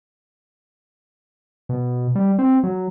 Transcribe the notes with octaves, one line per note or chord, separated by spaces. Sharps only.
B2
G3
C4
F#3